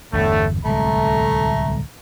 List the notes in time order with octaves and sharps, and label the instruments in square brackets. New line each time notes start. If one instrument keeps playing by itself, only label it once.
[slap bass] G1 E2 [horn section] A2 D3 A3
[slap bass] D1 C2 G#3 [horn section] A3 A#5